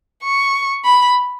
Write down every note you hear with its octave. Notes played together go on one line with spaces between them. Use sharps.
C#6
B5